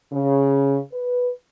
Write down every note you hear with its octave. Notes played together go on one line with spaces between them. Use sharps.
C#3
B4